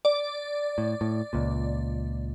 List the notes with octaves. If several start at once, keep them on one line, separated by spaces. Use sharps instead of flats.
D5
A2
A2
C#2 A#2